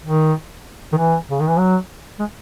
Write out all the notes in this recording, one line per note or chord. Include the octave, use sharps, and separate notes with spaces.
D#3
D#3
E3
C#3
D#3
E3
F#3
G#3